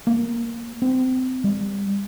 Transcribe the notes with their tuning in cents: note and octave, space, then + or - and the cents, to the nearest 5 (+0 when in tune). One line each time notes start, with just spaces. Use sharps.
A#3 +0
C4 -25
G3 +25